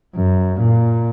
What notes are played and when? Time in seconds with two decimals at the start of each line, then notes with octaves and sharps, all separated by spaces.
0.16 F#2
0.61 A#2